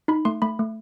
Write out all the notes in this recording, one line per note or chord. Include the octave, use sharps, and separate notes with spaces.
D#4 B5
A3 C6
A3 B5
A3